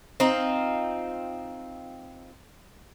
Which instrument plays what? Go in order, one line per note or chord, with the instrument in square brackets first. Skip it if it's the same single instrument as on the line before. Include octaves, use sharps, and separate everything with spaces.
[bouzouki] C4 D#4 F4